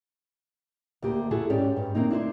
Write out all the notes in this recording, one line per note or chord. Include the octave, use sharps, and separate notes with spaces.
D2 A#3 G4
E4 F#4 G#4 A4
G#2 C#4 G4 D5
G2
D#3 A#3 C4 D#4
D4 E4 B4 C5